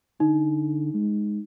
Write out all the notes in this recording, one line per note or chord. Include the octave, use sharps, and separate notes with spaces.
D3 D#4
G#3